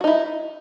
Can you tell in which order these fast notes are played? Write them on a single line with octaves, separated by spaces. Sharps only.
F#4 D#4 E4